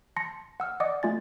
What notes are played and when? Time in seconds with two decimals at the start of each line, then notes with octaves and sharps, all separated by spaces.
0.16 A5 C6 A#6 C#7
0.60 F#5 E6 F6
0.80 D5 D#5 F#5 D6 D#6
1.03 A3 F4 G#5 A6